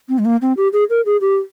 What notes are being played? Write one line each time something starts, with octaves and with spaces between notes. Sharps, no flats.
C4
G#3
A#3
C4
G4
G#4
A#4
G#4
G4